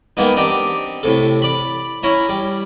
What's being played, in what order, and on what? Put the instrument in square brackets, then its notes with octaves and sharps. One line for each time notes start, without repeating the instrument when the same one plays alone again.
[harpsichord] D#3 G#3 A#3 B3 D#4
C4 D4 D#4 G4
A2 C3 A4
D5 B5
C#4 E4 A#5
G3